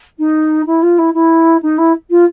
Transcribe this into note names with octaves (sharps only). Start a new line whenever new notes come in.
D#4
E4
F4
E4
E4
D#4
E4
F4